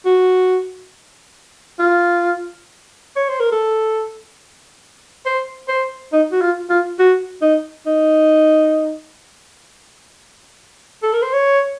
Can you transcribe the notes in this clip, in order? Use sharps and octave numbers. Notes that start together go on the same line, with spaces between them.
F#4
F4
C#5
C5
A#4
A4
C5
C5
D#4
F#4
F4
F4
F#4
D#4
D#4
A4
A#4
C5
C#5